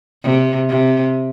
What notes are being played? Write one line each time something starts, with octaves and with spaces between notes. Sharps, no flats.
C3
C3